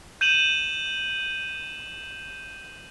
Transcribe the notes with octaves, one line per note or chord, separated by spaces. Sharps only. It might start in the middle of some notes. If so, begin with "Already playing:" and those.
G6 D#7 E7 F#7